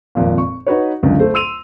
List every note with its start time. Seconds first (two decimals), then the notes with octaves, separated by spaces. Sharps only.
0.15 G#1 F2 A#2
0.38 C#6
0.66 D#4 F#4 B4 C#5
1.03 G1 C#2 F#2 D3
1.19 A3 C5
1.34 C6 E6 D#7 F7